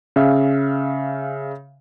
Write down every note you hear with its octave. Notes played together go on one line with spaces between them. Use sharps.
C#3 E5 F5